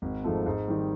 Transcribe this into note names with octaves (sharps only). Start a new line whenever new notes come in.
G#1
G#2 F3 A3
G#2
D#3 G3